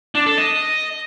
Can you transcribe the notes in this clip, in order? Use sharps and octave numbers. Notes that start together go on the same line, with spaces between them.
D4
A4
D#5